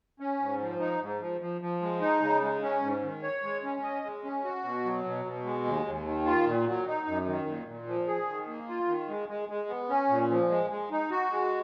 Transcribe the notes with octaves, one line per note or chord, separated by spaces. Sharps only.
C#4
G#2
F3
D#4
G#2
F3
F3
F3
G#3
D#4
C#3
G#3
C#4
G#2
D#3
C#5
G#3
C#4
D#5
G#3
C#4
F#4
B2
F#3
B2
B2
G#3
D#2
D#2
D#3
F4
A#2
F#3
D#4
F#2
D#3
A#2
A#2
F3
G#4
D#3
A#3
F4
D#3
G#3
G#3
G#3
B3
C#4
A#2
F3
G#3
G#3
D#4
F#4
G#3